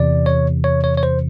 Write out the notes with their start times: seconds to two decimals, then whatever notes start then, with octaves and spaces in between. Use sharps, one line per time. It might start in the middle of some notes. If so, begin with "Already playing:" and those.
Already playing: E2 C3 E3 D5
0.26 C#5
0.64 C#5
0.84 C#5
0.97 C#5
1.03 C5